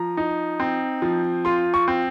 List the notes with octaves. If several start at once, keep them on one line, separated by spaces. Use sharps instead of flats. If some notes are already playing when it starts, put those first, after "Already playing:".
Already playing: F3 A#5
D#4
C4
F3
F4 C6
C#6
C4